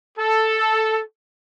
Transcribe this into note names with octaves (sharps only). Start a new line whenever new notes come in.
A4